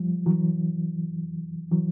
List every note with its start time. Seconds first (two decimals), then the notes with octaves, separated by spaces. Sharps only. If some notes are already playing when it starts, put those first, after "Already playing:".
Already playing: F3 G3
0.26 E3 F#3
1.71 E3 F#3